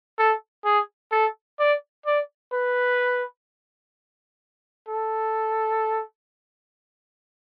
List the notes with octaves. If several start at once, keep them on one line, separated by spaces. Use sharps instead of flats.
A4
G#4
A4
D5
D5
B4
A4